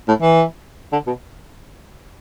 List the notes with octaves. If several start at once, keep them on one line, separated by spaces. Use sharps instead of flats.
A2
E3
D3
B2